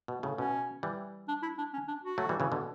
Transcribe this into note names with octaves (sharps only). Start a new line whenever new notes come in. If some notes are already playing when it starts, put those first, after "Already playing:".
B2
A2 C#3
B2 C#4
E3 G3
D4
E4
D4
C#4
D4
F#4
F#3 A3
E3 G3
C#3 E3
B2 D3